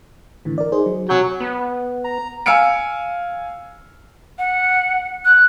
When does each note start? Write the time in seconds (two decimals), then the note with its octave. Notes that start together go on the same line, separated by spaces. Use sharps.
0.45 A2 D3 E3
0.58 A#4 D5
0.72 D#4 G#4 C5
0.86 F#3
1.09 C3 F#3 G#5 G6
1.40 B3
2.04 A#5
2.46 F5 G#5 E6 F6 C#7 D7
4.38 F#5
5.25 F#6